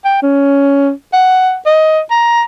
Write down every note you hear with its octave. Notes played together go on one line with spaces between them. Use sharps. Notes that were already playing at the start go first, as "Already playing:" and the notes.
G5
C#4
F#5
D#5
A#5